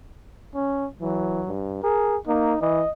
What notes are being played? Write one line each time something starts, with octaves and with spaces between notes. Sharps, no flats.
C#4
E3 F#3
G2
G#4 A#4
A#3 D#4
E3 D#5